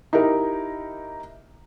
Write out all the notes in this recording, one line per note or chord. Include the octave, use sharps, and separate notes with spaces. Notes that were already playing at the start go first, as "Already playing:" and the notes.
D#4 E4 G4 A#4